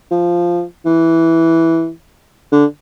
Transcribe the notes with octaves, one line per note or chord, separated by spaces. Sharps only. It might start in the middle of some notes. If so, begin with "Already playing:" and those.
F3
E3
D3